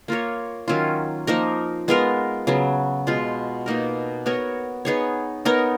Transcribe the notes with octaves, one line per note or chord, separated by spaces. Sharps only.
A#3 F4 A#4 C#5
D#3 F#3 C#4 F4
F3 A#3 D#4 A#4
G#3 B3 F4 A#4
C#3 F#3 B3
B2 G#3 B3 F4
B2 A#3 D#4 A#4
B3 F#4 A#4 C#5
B3 D#4 G#4 C#5
B3 D#4 A#4 C#5